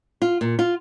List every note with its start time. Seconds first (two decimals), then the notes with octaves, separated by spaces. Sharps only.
0.22 F4
0.41 A#2
0.59 F4